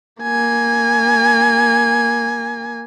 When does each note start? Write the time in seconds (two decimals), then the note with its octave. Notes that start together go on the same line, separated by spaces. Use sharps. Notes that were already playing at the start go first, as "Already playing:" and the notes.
0.23 A#3 G#5